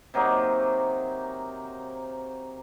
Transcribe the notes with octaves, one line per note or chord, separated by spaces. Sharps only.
C3 F#3 A#3 D#4